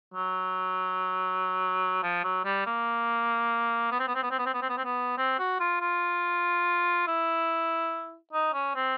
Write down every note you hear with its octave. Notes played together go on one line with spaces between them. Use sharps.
F#3
F3
F#3
G3
A#3
B3
C4
B3
C4
B3
C4
B3
C4
B3
C4
B3
C4
B3
C4
F#4
F4
F4
E4
D#4
C#4
C4